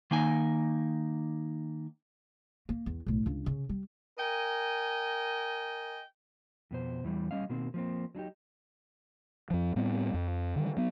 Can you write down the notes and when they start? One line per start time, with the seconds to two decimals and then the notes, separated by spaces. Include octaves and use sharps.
0.11 D#3 A#3 D#4 G#5
2.69 A#3
2.86 E2
3.06 B1 A2
3.26 C#2 D4
3.46 C#3
3.69 G3
4.17 A#4 D#5 G5 G#5
6.71 F2 B2 C5
7.04 E2 E3 G3
7.31 G3 C#4 D#5 F5
7.49 B2 D#3 A#3 C4
7.74 F3 A#3 C4
8.15 F#3 D4 D#4 G4
9.50 F2 F3
9.76 A2 G3 B3 C4
10.14 F2
10.56 D3 D#3 G3
10.77 F#3 B3